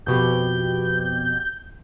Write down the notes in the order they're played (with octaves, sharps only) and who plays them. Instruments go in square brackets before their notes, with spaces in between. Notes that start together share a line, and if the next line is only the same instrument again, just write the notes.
[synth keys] F2 B2 G4 [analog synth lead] G6